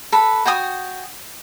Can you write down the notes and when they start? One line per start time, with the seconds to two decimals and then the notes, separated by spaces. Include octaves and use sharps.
0.12 A4 B4 B5
0.46 F#4 G5 G#5 D#6